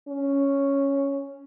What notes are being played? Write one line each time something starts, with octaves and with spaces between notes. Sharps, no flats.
C#4